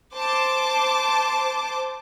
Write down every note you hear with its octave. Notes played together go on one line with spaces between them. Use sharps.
C5 A5 D6